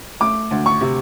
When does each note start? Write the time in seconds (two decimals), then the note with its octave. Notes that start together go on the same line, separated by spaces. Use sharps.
0.20 A3 D6
0.51 D2
0.66 C#6
0.81 C3